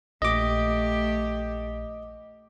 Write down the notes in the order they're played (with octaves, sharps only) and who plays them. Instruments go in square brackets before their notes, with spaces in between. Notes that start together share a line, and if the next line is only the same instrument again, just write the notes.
[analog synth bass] A#1 [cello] A3 G4 [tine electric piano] D#5 D6